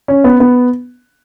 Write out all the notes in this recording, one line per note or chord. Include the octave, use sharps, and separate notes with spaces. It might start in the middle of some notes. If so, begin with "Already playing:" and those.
C#4
B3
B3